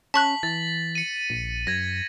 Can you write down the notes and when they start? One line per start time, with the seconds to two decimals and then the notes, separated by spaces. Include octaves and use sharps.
0.14 C#4 A5 C#6 F#6 B6 F#7
0.43 E3 A6
0.95 C#7 D#7
1.30 A#1
1.67 F#2 G#6 A#6